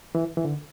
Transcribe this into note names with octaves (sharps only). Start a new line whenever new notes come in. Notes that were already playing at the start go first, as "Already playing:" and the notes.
E3
E3
D3